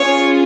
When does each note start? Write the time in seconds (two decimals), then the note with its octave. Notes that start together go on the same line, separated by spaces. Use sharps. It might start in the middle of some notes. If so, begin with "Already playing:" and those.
Already playing: C#4 F4 G#4 C#5